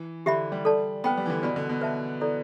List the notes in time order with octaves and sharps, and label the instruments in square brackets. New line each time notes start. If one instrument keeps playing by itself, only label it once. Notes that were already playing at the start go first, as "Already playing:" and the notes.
Already playing: [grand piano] E3
[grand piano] D3 [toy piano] G4 E5 B5
[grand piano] G3
[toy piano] A4 D5 A5
[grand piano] B3 [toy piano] B4 G5 B5
[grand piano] G3
E3
D3
[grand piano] B2 [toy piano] B4 D5 B5
[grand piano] D3
B2
[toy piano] B4 E5 A5
E4 A4 D5